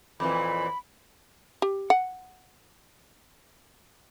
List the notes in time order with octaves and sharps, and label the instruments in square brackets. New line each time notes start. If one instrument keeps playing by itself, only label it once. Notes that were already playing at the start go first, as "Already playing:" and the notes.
[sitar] F2 A#2 E3 [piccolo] B5
[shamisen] G4
F#5